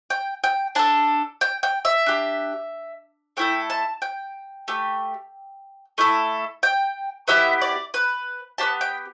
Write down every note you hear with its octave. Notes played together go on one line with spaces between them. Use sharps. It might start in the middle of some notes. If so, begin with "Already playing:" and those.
G5
G5
D4 A4 A5
G5
G5
E5
D4 G4
A3 E4 A4 G5
A5
G5
A3 G4
A3 E4 A4
G5
B3 E4 G4 E5
D5
B4
B3 D4 G4 A5
G5